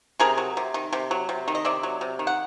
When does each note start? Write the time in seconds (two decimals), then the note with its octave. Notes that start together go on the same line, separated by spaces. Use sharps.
0.20 C3 G#4 A#4
0.38 F#3
0.57 C3
0.74 D#3
0.93 C3
1.11 F#3
1.29 C3
1.48 D#3
1.55 D#5
1.65 C3 D5 E5
1.83 F#3
2.01 C3
2.19 D#3
2.27 F#5